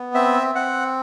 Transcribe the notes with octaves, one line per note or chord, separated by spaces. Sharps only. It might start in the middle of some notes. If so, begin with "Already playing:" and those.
Already playing: B3
C4 E5
C4 F#5